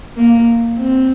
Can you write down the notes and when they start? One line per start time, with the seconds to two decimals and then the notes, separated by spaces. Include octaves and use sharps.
0.17 A#3
0.79 C4